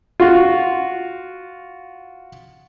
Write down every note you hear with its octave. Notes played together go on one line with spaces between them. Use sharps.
F4 F#4